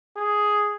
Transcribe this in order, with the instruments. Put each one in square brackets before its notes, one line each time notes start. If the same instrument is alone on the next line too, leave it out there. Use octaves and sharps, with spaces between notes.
[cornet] G#4